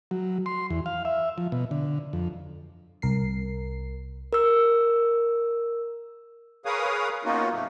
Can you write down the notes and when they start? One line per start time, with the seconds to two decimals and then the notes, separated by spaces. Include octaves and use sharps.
0.11 F#3
0.46 C6
0.70 E2
0.86 F5
1.05 E5
1.38 F3
1.52 B2
1.71 D3
2.13 F2
3.02 C2 A#4 C7
4.33 A#4 E6
6.65 G#4 A#4 B4 C#5 F5 D#6
7.25 A#3 B3 C#4 D#4 F4 F#4
7.52 G#2 C3 F#3 A3 A#3